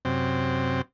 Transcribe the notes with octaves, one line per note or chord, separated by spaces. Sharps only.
F#2 C3 C4